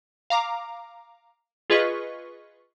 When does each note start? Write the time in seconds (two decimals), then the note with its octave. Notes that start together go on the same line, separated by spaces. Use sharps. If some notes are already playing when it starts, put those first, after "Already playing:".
0.30 F5 A#5 D6
1.70 F4 G#4 B4 D#5 C#6